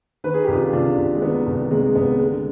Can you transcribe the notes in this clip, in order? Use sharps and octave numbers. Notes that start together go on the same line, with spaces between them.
D#3 B4
G#4
C2 G4
F4 G#4
C3 D4 F4
C2
G#3
D#3 B3
C2
C3 G#3
G#3
C2 B3
D3 G#3